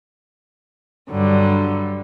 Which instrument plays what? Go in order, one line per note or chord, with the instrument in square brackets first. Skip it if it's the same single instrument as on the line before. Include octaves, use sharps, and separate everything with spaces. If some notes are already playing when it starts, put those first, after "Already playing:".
[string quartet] G2 D3 F#3 G3